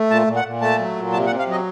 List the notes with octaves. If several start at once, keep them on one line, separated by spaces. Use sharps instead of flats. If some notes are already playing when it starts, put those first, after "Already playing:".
Already playing: A3
A#2 A5
A#2
F#5
A#2
A3 A5
F#3
A#2
C3 A5
F#5
C3
F5
F#3 D#5